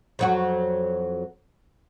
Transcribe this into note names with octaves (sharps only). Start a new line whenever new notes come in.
F2 F#3 F#4